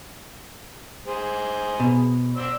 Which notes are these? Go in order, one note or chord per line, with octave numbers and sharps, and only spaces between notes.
G#4 C5
B2
C5 D5 E6